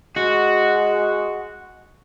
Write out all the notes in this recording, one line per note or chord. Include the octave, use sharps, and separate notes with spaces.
G#3 F#4